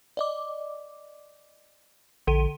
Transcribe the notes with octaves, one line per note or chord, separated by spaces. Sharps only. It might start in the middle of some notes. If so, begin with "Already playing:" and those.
D5 D#5 D6
A#1 D3 A4 D#7